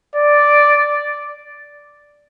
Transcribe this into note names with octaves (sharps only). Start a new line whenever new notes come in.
D5